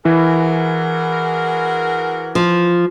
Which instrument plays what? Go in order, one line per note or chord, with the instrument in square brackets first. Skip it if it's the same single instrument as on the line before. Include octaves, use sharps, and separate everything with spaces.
[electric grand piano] E3 E4 [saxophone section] F#4 G#4 A#4
[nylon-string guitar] F3